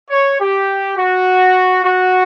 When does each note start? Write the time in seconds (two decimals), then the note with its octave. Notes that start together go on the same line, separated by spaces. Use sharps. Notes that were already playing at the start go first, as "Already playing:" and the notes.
0.11 C#5
0.40 G4
0.97 F#4
1.84 F#4